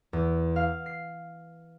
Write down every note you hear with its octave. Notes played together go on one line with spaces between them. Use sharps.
E2
F5
C7